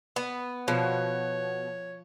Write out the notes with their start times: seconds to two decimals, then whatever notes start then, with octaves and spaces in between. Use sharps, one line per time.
0.16 B3
0.68 B2 F3 C#5